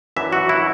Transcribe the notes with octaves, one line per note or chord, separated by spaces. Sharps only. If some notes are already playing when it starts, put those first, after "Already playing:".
F#2 E3 D4 E5
F#4
E4